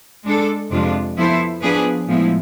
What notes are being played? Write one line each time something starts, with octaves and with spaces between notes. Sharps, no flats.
G#3 D4 A4
F2 C3 G#3 D4 F4
F3 B3 E4 A4 C5
F3 B3 D4 G#4 B4
A2 F3 G#3 B3 E4